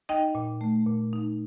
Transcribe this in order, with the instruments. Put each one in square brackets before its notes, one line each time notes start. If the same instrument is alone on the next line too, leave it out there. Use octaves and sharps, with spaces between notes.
[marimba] D#4 D#5 G5
A#2
A3
A#2
D#4